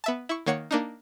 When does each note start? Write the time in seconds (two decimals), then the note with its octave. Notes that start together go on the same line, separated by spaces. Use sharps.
0.04 B3 E5 A5
0.29 E4 C#6
0.46 D#3 A#3 C#5 F#5 C#7
0.71 A#3 D4 D#4